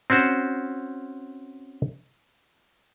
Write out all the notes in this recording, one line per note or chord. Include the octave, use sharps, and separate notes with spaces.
C4 C#4 F#4 C5